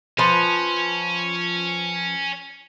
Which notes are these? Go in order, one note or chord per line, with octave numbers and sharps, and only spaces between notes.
F3 C#4 B4